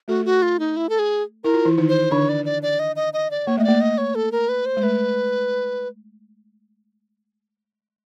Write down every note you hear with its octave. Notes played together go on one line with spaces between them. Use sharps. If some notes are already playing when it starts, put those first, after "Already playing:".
A3 F#4 A4
F#4
F4
D#4
E4
A4
G#4
E4 A#4
F4
E3 E4
D#3 D#4
C5
D3 D4 C#5
D5
D5
D5
D#5
D#5
D#5
D5
A#3 C#5
A3 D#5
A#3 D5
D#5
C#5
A4
A#4
B4
C5
G#3
A3 B4